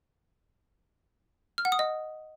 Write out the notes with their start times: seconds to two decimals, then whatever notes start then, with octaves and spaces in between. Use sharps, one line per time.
1.58 F6
1.65 F#5
1.72 D#6
1.79 D#5